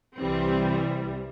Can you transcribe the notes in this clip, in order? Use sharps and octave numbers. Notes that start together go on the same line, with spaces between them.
C2 C3 E3 G3 C4